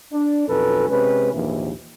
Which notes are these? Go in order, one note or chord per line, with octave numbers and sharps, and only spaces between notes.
D4
B1 F2 B2 C#4 A4 B4
C3 G#3 C#4 B4
A#1 D#2 G#2 E3